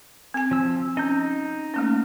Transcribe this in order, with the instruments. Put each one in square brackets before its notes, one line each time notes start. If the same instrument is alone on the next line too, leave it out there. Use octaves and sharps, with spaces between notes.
[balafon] C4 G#5
[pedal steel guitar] F3 E6
[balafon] C#4 [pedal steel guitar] D#4 G6
[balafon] A3 A#3 C#4